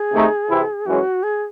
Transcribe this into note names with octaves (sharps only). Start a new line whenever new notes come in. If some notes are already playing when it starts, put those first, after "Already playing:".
Already playing: G#4
C3 D#3 A3 D#4
C3 E3 C4 E4
F#2 E3 G#3 C#4 F#4
G#4